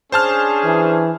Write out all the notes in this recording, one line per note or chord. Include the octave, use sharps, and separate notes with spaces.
C#4 D4 G#4 C5 A5 F6
E3